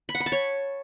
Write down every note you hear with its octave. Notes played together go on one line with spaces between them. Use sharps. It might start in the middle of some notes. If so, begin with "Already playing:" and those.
B5
F#5
B5
A5
C#5